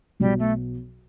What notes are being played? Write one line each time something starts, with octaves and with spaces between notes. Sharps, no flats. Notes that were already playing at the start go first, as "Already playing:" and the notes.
B1 B2 F#3 G3
A3